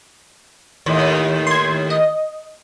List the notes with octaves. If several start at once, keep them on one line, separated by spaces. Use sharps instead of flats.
D#2 A2
C6 G#6
D#5